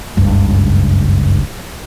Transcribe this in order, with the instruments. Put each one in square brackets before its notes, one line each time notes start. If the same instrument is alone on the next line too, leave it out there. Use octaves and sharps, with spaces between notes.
[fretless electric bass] F#1 C#2 G2